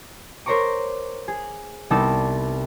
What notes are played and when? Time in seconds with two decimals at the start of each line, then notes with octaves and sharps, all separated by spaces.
0.46 A#4 C5 C#5 A#5 C#6 D6
1.28 G#4
1.90 C2 B3 D#4 A5 D6 E6